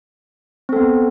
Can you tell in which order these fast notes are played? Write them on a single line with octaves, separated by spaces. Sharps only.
C4 A4 B3